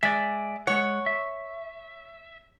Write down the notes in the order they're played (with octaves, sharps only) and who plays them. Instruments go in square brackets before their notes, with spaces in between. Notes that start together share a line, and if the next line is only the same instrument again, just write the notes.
[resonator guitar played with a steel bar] G#3 [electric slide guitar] D5 E5
[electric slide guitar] G#3 F#5 [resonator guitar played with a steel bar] C#5
[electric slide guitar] E5